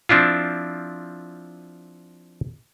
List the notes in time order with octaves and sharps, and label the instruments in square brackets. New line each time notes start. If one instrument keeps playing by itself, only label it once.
[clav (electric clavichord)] F3 C4 D4 E4 F4